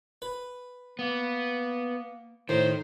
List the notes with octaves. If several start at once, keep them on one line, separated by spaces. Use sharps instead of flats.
B4
A#3 B3
A2 D#3 C5